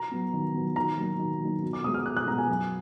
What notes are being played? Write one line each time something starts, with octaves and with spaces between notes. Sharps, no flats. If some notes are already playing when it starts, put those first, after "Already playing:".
Already playing: A#5
F#3 B3
D#3
F#3 B3
D#3 A#5
F#3 A#3 D#4
D#3
F#3 A#3 D#4
B2
D6
G#3 B3 D#6
F6
B2 F#6
F#6
G#3 B3 A#5
G#5
F#2